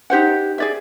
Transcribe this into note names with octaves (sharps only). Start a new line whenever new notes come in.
D#4 G4 C5 F#5
G#4 D5 E5